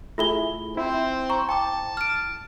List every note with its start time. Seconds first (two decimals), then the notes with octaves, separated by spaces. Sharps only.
0.18 A3 E4 F4 G#4 B5 G7
0.77 C4 E4 C5
1.30 A#5 C#6
1.49 G5 A5 D6
1.97 F6 D7